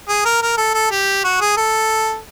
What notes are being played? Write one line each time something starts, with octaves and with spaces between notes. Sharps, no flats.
G#4
A#4
A#4
A4
A4
G4
F#4
G#4
A4